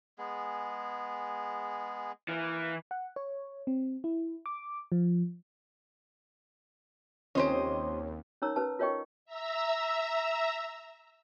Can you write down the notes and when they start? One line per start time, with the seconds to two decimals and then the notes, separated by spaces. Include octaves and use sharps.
0.18 G#3 B3 G#4
2.28 E3 A#3 F5
2.91 F#5
3.16 C#5
3.67 C4
4.04 E4
4.46 D6
4.92 F3
7.35 D#2 C4 C#4 F4 G4 C5 C#5 D#5
8.42 C#4 D#4 A#4 C#5 A#5 E6
8.56 C#4 B4 A5
8.79 F4 A#4 C#5 D#5 G5 C#6
9.25 E5 A#5 E6